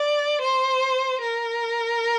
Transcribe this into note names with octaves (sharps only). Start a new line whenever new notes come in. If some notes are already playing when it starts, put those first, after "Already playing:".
Already playing: D5
C5
A#4